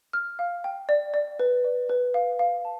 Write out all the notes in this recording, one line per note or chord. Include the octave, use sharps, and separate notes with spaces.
F6
F5
G5
D5
D5
B4
D5
B4
F5
F5
A5